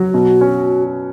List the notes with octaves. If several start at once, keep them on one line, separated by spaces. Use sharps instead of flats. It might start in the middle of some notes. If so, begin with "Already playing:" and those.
Already playing: F#3 F#4
B2
C#4